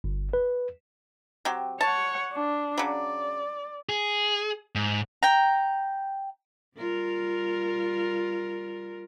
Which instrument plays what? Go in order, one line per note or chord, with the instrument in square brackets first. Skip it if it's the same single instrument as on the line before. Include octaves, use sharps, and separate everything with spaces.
[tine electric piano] G1
B4
[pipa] F#3 C4 G4
[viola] C#5 F#5 [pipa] A5
[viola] D4
[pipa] C#3 F#3 [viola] D5
[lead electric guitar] G#4
G#2
[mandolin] G5 A#5
[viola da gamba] G3 F4 A#4